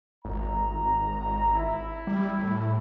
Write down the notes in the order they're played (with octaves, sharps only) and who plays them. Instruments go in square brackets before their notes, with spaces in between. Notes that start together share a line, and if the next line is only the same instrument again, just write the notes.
[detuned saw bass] G#1 [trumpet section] A#5
[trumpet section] E4
[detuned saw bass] G3
A2